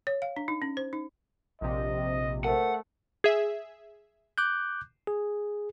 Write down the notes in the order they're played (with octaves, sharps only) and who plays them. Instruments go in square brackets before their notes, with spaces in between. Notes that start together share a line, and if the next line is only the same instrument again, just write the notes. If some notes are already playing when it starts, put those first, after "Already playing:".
[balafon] C#5
F5
D4
D#4
C#4
C5
D#4
[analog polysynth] A#1 C3 [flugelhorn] D#5
[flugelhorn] A3 [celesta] A#4 C5 [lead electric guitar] F#5
[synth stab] G#4 E5
[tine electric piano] D6 F#6 G6
G#4